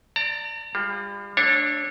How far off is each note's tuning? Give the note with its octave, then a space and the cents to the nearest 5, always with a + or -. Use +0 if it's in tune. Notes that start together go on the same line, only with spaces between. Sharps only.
D5 +0 A#5 -45
G3 +40 F4 +0
A3 +0 D4 +0 C#5 -25